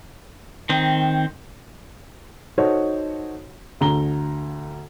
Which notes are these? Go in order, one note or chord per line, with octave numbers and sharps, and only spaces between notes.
D#3 C4
D#4 F#4 A4 C5 C#5
D2 D3 A#5 G7